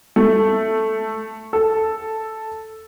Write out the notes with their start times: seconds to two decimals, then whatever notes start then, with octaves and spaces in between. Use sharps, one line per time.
0.16 A3
1.53 A4